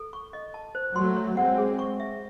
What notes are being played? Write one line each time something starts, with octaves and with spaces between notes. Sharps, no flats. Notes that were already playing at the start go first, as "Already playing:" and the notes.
Already playing: A4
C#6
D#5
A5
C5
F#3 A3 C6
C#5
G#3 C4 F#5
G#4
C#6
E5